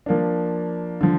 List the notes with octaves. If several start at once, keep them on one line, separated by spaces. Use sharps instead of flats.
F3 A#3 D4
D3 F3